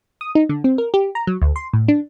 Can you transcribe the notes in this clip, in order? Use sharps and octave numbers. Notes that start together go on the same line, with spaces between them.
D#6
D#4
D3
C4
A#4
G4
A#5
F#3
D2
C6
A2
D4